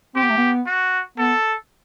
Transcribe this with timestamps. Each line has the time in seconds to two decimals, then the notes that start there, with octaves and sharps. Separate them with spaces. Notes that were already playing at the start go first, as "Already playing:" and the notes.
0.15 C4 G4
0.23 B3
0.30 A3
0.38 B3
0.66 F#4
1.18 B3 A4